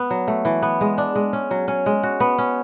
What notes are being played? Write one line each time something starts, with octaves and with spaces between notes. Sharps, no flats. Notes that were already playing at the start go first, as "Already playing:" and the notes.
Already playing: B3
F#3
A3
E3
B3
G#3
D4
G#3
C#4
F#3
C#4
G#3
F#4
B3
C#4